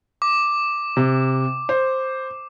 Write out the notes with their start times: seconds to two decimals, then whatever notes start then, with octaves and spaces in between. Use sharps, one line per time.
0.22 D6
0.97 C3
1.69 C5